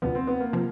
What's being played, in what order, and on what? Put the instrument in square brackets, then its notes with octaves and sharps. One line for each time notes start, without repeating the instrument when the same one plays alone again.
[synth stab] D2 C3 F3 [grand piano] B3
[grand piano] C4
B3
A#3
[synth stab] C3 F3